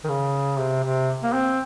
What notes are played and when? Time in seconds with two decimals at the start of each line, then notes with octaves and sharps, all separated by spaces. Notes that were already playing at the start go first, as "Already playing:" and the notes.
0.05 D#3
0.09 C#3
0.58 C3
0.84 C3
1.24 A#3
1.33 C4